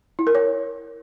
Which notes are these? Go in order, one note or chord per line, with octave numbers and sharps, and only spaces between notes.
E4
A#4
C#5